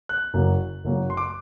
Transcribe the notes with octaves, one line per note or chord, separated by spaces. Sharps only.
F#6
F#1 F#2 F#3 A#3
F#1 F#2 F#3 A#3
C6
D6